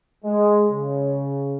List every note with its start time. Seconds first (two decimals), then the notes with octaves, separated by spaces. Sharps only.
0.25 G#3
0.71 C#3